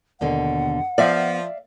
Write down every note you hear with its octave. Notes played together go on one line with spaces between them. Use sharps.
D#2 B2 D3 F#5
F3 B3 D5 E5 F5